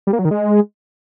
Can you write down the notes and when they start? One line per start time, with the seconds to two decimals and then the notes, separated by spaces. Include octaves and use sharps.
0.07 G3
0.13 A#3
0.19 F#3
0.25 D#3
0.31 G#3